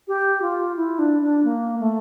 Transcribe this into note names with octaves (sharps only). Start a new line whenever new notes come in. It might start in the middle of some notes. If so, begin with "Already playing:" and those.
G4
F4
E4
D4
D4
A#3
A3